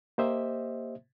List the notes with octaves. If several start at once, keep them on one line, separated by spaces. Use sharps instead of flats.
A#3 G4 C5 D#5 E5